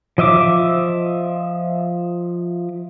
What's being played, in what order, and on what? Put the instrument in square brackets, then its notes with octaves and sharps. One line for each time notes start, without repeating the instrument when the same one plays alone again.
[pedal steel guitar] F3 D#5 E5 D6 D#6